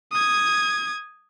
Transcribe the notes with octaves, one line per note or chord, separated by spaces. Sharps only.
D#6 G#6